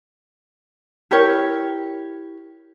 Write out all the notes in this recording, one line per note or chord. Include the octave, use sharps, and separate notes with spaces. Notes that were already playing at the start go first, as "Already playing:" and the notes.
E4 G4 A#4 C#5